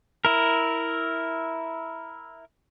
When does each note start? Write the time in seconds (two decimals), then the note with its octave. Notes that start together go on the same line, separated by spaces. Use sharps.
0.25 E4 A#4